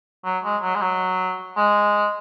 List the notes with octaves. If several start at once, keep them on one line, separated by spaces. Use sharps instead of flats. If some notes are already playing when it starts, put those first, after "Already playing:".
F#3
G#3
F#3
G#3
F#3
G#3